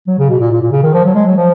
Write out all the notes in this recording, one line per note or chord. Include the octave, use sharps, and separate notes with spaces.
F#3
C#3
B2
A#2
A#2
A#2
C#3
D#3
F3
F#3
G#3
F#3
F3